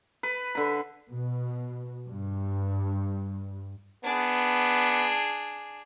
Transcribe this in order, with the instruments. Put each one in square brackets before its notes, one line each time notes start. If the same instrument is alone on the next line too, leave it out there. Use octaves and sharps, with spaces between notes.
[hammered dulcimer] B4
D3 B5
[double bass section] B2
G2
[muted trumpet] B3 [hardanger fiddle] D4 G#4